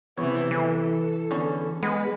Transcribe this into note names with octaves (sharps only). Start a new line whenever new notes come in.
E2 C3 E3 B3 C#5
E3 A4
E2 D3 C#4
G#3 B3 B4